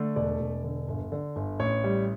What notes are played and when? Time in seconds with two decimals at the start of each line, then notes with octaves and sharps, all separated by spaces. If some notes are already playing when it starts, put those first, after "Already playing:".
Already playing: D3 A3
0.16 E1 D5
0.40 E1
0.64 D3
0.88 G1
1.12 D3
1.36 G1
1.59 A1 C#5
1.84 G3